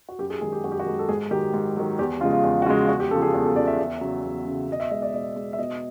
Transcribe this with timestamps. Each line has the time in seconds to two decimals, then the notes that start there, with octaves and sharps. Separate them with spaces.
0.09 F#4
0.19 F#2 G4
0.30 G#4
0.41 D#3 G#3 G#4
0.53 G4
0.64 F#2 F#4
0.72 G4
0.80 F#4
0.86 D#3 G#3
0.99 A4
1.09 G#2 G#4
1.31 D#3 F#3 G4
1.54 G#2
1.77 D#3 F#3
1.99 E2 G4
2.21 C#3 F3 G#3 F4
2.33 F4
2.44 E2
2.62 F#4
2.66 C#3 F3 G#3 F4
2.88 E2 F#4
3.00 G4
3.11 C#3 A4
3.16 F3
3.22 G#4
3.34 E2 G#4
3.45 A4
3.56 C#3 F3 D5
3.67 E5
3.79 E2
4.01 C#3 F#3
4.24 E2
4.46 C#3 F#3
4.69 B2 D#5
4.80 E5
4.91 G#3 D#5
5.02 D5
5.14 B2 D#5
5.36 G#3
5.53 E5
5.59 B2 D#5